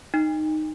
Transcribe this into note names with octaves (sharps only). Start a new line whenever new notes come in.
D#4